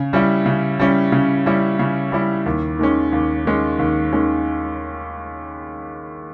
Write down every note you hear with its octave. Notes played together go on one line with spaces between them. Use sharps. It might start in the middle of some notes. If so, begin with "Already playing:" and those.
Already playing: C#3
G3 C#4 E4
C#3
G3 C#4 E4
C#3
G3 C#4 E4
C#3
G3 C#4 E4
D#2
D#3 G#3 C#4
D#2
D#3 G#3 C#4
D#2
D#3 G#3 C#4